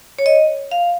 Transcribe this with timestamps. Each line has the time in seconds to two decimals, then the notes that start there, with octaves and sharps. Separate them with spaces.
0.19 C#5
0.26 D#5
0.71 F5